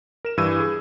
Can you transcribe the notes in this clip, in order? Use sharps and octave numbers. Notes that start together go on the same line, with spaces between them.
A#4 E7
G2 E3 E6 G#6 D#7
G#4